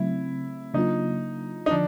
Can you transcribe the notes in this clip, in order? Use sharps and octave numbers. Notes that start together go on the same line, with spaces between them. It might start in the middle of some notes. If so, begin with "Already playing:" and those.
Already playing: C#3 F#3 A3 C4 E4
C#3 F#3 A#3 D4 D#4 F4
D#4
D3 F3 D4